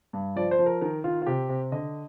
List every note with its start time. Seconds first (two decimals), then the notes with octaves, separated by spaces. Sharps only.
0.13 G2
0.36 F3 D5
0.51 C5
0.59 F3
0.66 A#4
0.81 D#3 A#4
1.04 D#3 F4
1.22 F4
1.26 C3 G4
1.49 C3
1.72 D3 D#5